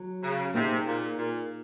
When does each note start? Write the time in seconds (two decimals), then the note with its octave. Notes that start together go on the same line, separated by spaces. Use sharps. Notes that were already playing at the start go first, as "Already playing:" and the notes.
Already playing: F#3
0.22 C#3
0.54 C3 A#3 D#4 G#4
0.86 A#2
1.18 A#2